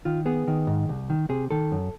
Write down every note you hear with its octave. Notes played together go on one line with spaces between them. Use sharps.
D#3 F4
B3 G#4
D#3
G#2
C2
D#3
C3 G#4
D#3 A4
F#2